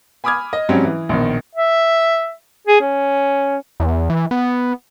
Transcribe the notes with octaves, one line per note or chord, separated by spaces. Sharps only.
G#5 B5 D6 D#6 F6 G#6
D#5
G#2 F#3 G3 C4 C#4
E3
A#1 B2 D#3
E5
G#4
C#4
E2
E3
B3